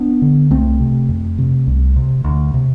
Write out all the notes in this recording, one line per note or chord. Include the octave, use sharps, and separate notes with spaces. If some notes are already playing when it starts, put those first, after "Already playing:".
Already playing: B3 D4
D3
C2 A3 C4
C3
F2
C3
C2
C3
D2
C3